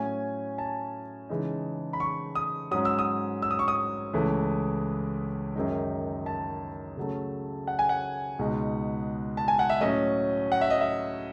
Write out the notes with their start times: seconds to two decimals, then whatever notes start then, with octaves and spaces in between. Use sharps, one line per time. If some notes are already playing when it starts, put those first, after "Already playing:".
Already playing: A2 F#3 C#4 G#5
0.58 A5
1.29 C#3 E3 G#3 D#4
1.93 B5
2.00 C#6
2.35 D#6
2.71 G#2 F#3 C#4 D#6
2.85 E6
2.99 D#6
3.42 E6
3.51 D#6
3.59 C#6
3.68 D#6
4.13 C#2 C#3 E3 A3
5.55 F#2 D#3 G#3 D#4
6.26 A5
6.97 C#3 F#3 A3
7.68 F#5
7.79 G#5
7.89 F#5
8.39 C#2 B2 G#3 D#4
9.37 A5
9.48 G#5
9.59 F#5
9.70 E5
9.80 A2 F#3 C#4 D#5
10.52 F#5
10.61 E5
10.70 D#5
10.81 E5